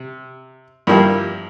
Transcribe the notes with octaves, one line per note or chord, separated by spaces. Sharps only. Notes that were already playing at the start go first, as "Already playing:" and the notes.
Already playing: C3
G2 F3 A#3 E4 G4